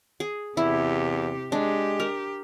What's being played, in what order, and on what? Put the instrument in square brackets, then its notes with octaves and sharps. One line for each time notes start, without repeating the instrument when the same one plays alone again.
[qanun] G#4
[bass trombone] E2 [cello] C3 G4 [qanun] E4
[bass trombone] G#3 [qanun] D4 [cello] G4
[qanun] A#4